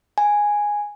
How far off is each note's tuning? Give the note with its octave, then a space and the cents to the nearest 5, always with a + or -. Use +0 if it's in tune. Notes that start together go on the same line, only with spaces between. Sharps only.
G#5 -5